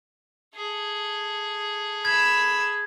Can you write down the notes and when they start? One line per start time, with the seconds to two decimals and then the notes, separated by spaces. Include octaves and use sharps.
0.55 G#4 A4
2.05 B5 E6 G#6